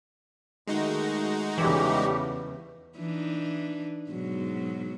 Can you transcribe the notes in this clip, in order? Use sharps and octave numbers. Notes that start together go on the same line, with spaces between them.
D#3 G#3 A3 D#4 F#4
E2 C#3 E3 G3 A3 G4
E3 D4 D#4
G#2 B2 F#3